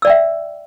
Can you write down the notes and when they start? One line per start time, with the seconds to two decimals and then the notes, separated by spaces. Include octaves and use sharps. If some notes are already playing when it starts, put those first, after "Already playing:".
0.02 E6
0.05 D5
0.07 G5
0.10 E5